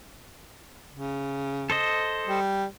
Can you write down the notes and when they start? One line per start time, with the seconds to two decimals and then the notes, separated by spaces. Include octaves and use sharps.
0.92 C#3
1.70 A4 C5 D#5
2.27 G3